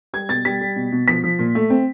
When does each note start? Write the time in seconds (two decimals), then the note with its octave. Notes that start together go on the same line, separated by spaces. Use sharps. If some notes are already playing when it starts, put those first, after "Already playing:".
0.13 G3 G#6
0.29 B2 A6
0.45 G3 B6
0.61 G3
0.76 B2
0.92 B2
1.08 F3 B6
1.24 F3
1.39 A#2
1.55 A3
1.70 C4